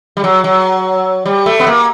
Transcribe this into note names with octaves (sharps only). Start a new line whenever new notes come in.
G3
F#3
F#3
G3
A3
B3
A#3